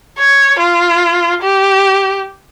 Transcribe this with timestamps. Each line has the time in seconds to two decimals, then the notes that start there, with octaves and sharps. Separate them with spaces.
0.18 C#5
0.59 F4
1.42 G4